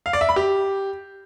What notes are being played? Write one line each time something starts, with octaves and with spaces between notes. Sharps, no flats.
F5
D5
E5
B5
G4